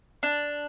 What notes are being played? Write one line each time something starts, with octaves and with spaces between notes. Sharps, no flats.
D4